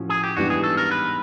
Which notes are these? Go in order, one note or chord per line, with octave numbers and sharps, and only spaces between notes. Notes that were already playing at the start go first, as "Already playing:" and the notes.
Already playing: A2 F3 C#4 F#4
G#4
G4
G#2 E3 G3 B3 D4 F#4
G#4
A4
A#4
B4